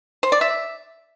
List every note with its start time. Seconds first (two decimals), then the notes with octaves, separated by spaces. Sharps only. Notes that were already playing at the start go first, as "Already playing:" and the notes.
0.23 C5
0.32 D5
0.41 E5